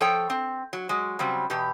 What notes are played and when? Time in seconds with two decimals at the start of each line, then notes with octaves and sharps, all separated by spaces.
0.01 F3 A4 C#5 G5
0.30 C4
0.73 F#3
0.89 F#3 G#3
1.19 C#3 F#3 G3 C4
1.50 E2 B2 G4